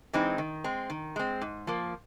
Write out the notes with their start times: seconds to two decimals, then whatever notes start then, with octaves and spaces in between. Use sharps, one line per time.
0.13 E3 G#3 C4 D#4
0.38 D#3
0.64 G#3 C4
0.90 D#3
1.16 G#3 C4
1.41 G#2
1.67 F3 A#3